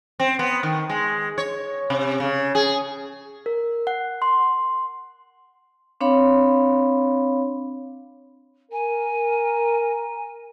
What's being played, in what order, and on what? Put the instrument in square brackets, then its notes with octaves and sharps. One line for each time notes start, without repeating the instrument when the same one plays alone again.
[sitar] C4
B3
D#3
G#3
C#5
C3
C#3
G#4
[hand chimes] A#4
F#5
C6
[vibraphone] C4 D4 C#5 F5 B5
[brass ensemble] A#4 [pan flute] G#5